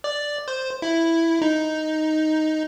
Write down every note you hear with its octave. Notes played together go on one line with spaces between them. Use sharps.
D5
C5
E4
D#4